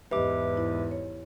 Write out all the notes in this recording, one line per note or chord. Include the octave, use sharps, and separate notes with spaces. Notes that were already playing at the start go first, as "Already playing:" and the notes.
E2 G#2 G4 B4 D#5 E5 D6
E4
C#5